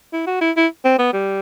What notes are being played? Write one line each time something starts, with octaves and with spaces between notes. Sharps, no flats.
E4
F#4
E4
E4
C4
B3
G3